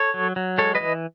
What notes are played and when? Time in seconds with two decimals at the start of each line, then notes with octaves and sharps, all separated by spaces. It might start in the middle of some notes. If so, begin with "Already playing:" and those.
Already playing: A4 C#5
0.14 F#3
0.36 F#3
0.58 G#3 A4 C#5
0.75 B4 D#5
0.80 E3